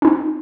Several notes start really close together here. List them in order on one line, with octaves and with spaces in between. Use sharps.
C#4 D#4 C4